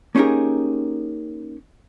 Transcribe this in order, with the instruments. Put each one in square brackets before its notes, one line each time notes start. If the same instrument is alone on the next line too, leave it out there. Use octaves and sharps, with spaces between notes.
[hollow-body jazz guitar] A#3 C#4 D#4 G4 G#4 A#4